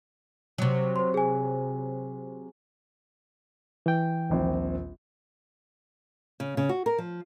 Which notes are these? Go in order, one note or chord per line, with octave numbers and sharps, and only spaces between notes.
C3 F#3
C5 C6
G#4 G#5
E3 G5
D#1 A#1 C4
C#3
C#3
F#4
A#4
F3